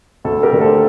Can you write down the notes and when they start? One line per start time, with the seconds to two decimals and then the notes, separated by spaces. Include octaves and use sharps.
0.25 D2 A4
0.43 G4 A#4
0.52 D3 A3
0.61 A4 C5